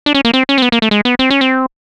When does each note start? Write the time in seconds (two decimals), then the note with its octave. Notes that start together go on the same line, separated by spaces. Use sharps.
0.06 D4
0.15 C#4
0.25 A#3
0.34 C4
0.49 C#4
0.58 C4
0.62 B3
0.72 A#3
0.82 A3
0.91 G#3
1.05 B3
1.19 C4
1.30 C#4
1.41 C4